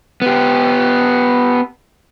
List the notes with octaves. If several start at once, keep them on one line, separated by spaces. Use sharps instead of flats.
B3 G4